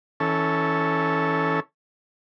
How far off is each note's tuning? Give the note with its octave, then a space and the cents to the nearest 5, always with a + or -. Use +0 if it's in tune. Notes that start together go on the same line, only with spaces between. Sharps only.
E3 -25 C#4 +0 A4 +0